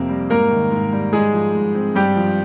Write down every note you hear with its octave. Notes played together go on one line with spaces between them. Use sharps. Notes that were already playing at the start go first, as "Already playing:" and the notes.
Already playing: F2 C3 F3 A#3 C4 A#4
G3
G#2 A#3 A#4
D#3
G#2
G3
G#2 G#3 G#4
F3
G#2
C4
G2 G3 G4
F3